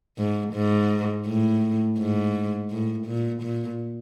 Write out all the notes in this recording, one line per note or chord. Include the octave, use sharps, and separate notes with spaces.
G#2
G#2
A2
G#2
A2
A#2
A#2